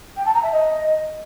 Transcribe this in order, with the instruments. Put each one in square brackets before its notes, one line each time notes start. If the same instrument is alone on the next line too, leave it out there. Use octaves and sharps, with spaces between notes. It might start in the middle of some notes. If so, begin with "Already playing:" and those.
[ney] G5
A5
A#5
E5
D#5